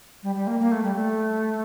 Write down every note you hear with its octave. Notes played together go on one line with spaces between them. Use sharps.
G3
G3
A#3
A#3
A3
G3
A3